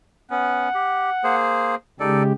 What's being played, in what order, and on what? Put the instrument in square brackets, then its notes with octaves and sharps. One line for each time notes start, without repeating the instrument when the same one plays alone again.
[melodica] B3 C#4 [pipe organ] F#5
[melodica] G4
A#3 G#4 C5
[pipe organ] C#3 G#3 G4 [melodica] D#4 A4 D5